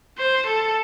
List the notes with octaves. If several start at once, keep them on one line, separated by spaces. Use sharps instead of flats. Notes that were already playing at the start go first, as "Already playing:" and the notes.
C5
A4